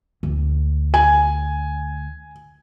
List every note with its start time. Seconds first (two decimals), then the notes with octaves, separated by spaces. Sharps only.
0.23 D2
0.94 G#5